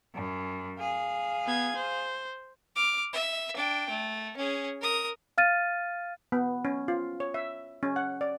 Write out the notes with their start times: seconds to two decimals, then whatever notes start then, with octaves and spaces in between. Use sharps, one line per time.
0.15 F#2
0.79 G#4 F5
1.45 B3 G#6
1.76 C5
2.76 D6 F6
3.13 E5
3.56 D4 G5
3.89 A3
4.37 C#4 G#4
4.81 A#4 D#6
5.38 F5 F6 A6 D#7
6.32 B3
6.65 C#4
6.88 F4
7.20 C#5
7.34 E5
7.83 C#4
7.96 F#5
8.21 D5